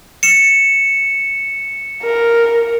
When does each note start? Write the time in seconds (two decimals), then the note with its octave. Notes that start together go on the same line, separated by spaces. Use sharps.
0.23 C#7 E7
2.03 A#4